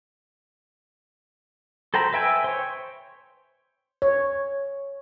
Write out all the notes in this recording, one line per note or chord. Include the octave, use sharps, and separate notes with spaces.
A4 C5 G5 A#5 B5
B4 E5 G5 G#5 E6
C5 C#5
C#5